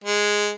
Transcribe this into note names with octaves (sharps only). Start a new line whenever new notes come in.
G#3